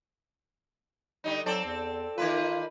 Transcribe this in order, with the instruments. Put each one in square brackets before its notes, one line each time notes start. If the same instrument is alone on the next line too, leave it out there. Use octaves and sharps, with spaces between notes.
[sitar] D3 G3 D#4
[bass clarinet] F#3 [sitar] C4 A4 D5
[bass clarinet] E2
[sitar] D#3 A#3 B4 [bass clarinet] F4